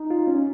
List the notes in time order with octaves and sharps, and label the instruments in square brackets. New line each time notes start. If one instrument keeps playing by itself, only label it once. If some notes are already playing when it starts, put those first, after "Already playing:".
Already playing: [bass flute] D#4
[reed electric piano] F4
C#4